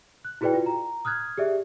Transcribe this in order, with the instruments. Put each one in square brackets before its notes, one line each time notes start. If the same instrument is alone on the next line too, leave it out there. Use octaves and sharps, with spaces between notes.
[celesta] F#6
E4 F#4 G#4 B4 D5 G5
F4
A#5
D#6 F6 F#6 G#6
G4 G#4 D5 E5